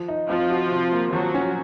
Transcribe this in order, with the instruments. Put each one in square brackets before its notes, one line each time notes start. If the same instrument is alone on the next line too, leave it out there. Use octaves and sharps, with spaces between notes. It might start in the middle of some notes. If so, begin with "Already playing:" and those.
Already playing: [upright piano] F3
D#4
[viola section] F3 F4 [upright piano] C4
[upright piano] F#4
C3
A#3
[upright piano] F3 [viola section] F#3 F#4
[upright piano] C#4